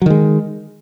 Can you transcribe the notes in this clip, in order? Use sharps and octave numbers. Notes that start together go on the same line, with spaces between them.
D#3 F#3 G#3